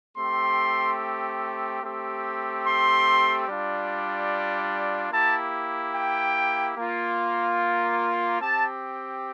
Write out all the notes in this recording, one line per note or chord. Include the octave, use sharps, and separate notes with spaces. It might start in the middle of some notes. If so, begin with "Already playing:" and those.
A3 C4 G4 C6
A3 C4 G4
C6
G3 D4 F4
A#3 E4 G4 A5
G5
A#3 F4
C4 G4 A5